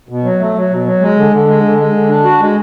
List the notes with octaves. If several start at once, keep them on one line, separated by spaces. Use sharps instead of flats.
B2
F#3
A3
F#3
B2
F#3
G#3
D3
D3
G#3
D3
G#3
D3
D4
F#4
G#3